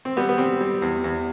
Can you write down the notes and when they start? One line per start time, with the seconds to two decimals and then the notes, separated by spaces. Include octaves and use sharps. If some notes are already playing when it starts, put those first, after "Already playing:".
0.05 C4
0.17 G3 B3
0.29 B3
0.38 G3 C4
0.61 G3
0.82 E2
1.04 E2